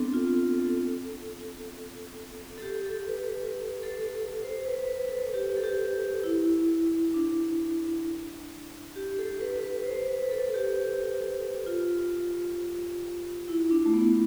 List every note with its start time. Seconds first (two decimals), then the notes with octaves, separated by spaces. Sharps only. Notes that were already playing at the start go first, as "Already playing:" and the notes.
Already playing: B3 C4 D4 A4
0.14 F4
0.58 A4
2.58 A4
2.62 G4
2.85 A4
3.08 B4
3.83 A4
4.13 A4
4.43 C5
4.66 B4
4.88 B4
5.11 A4
5.34 G4
5.57 A4
5.64 G4
6.24 E4
7.14 D4
8.96 G4
9.19 A4
9.41 B4
9.64 B4
9.86 C5
10.08 B4
10.31 A4
10.54 G4
11.66 F4
13.48 E4
13.71 D4
13.86 A3
13.94 B3